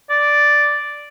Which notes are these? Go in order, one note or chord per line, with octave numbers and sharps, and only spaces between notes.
D5